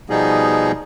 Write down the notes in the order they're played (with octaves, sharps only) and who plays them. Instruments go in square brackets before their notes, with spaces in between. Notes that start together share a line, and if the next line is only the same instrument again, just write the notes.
[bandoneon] B2 F3 G3 B3 D#4 G#4